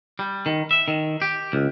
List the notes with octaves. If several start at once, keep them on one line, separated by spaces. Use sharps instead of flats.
G3
D#3
E5
D#3
G4
C#2